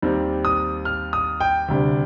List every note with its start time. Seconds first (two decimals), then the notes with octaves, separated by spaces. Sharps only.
0.02 D#2 D#3 G3 C4
0.45 D#6
0.85 F6
1.13 D#6
1.40 G5
1.68 D2 C3 G3 D4